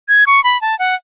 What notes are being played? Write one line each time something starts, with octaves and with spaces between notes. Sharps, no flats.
G#6
C#6
B5
A5
F#5